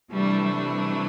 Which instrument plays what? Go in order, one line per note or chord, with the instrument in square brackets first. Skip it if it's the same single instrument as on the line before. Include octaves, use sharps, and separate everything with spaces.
[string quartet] C3 E3 A3 D4 [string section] G3
[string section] G3